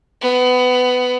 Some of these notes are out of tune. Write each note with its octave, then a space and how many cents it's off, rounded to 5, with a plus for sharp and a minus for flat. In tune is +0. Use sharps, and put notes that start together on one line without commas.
B3 +20